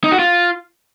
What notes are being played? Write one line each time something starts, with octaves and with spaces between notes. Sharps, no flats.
D#4
F#4
F4